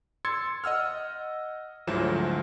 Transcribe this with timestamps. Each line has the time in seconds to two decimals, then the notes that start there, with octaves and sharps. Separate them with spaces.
0.25 C6 E6 G#6 A6 C#7
0.64 D#5 F#5 E6 F6
1.87 D2 G#2 F3 F#3 E4 E7